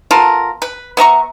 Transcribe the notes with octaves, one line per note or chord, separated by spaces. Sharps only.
B3 F4 A4 A#4
B4
B3 E5 A#5 C#6